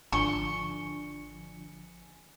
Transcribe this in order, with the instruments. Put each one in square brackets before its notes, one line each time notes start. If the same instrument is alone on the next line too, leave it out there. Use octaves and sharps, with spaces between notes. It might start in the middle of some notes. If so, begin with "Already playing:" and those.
[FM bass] G#1 [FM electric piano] D3 F3 D4 [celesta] G#5 C#7 G7 [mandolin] C#6